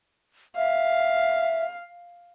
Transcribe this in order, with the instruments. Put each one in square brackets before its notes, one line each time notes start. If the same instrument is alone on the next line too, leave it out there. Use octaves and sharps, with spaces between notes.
[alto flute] E5 [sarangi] F5